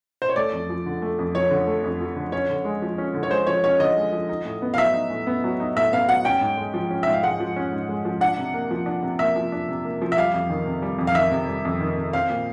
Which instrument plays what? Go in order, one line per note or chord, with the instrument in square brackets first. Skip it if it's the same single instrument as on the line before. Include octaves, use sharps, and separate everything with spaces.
[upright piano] C5
C#5
[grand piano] A3 [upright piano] D5
[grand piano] F2
F3
D3
A3
F2
[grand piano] F3 [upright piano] C#5
[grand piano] D3
A3
F2
F3
D3
[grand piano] C#4 [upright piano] C#5
[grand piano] D3
G#3
F3
C#4
D3
[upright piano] C#5
[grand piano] G#3 [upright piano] C5
[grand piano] F3 [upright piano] C#5
[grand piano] C#4 [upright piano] C#5
[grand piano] D3 [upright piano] D#5
[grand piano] G#3
F3
D#4
A2
B3
[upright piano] F5
[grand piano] F#3 [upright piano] E5
[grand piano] D#4
A2
B3
F#3
D#4
[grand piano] A2 [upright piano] E5
[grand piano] B3 [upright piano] F5
[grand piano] F#3 [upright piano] F#5
[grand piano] C#4 [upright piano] G5
[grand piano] G#2
G#3
F3
C#4
[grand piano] G#2 [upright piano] E5
[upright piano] F5
[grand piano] G#3 [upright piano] F#5
[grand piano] F3
C#4
G#2
G#3
F3
[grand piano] D4 [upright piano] F#5
[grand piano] C3
A#3
F3
D4
C3
[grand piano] A#3 [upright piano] E5
[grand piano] F3
D4
C3
A#3
F3
[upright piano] E5
[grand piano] G3 [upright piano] F5
[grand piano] F2
D#3
C3
G3
F2
[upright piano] F5
[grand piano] D#3 [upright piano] E5
[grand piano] C3
G3
F2
D#3
C3
[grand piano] C4 [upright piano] F5
[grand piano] A#2